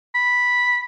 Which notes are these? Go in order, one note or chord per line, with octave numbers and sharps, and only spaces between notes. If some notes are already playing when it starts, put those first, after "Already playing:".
B5